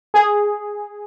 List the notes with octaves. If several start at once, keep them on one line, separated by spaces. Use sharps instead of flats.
G#4